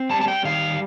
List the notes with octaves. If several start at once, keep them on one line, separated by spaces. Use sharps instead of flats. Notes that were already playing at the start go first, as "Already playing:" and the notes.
Already playing: C4
G3 A5
A5
G5
D#3 F5